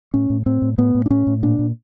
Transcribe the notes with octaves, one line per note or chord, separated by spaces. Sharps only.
A2 C#4
A2
A2 C4
A2
A2 B3
A2
D4
A2 C#4
A2
A#2 D4
A#2